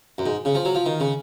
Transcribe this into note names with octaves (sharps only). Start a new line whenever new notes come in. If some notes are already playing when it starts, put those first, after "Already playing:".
F#2
G#2
C#3
F3
F#3
F3
D#3
C#3